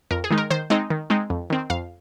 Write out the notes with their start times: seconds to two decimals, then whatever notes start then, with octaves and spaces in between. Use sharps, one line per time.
0.11 F2 A#4
0.24 G#4
0.30 D#3 G#3 D#4
0.38 A#4
0.50 D#3 C5
0.70 G#3 C4 D#4 D#5
0.90 D#3
1.10 G#3 C4 D#4
1.30 F2
1.50 D#3 C4
1.70 F2 F5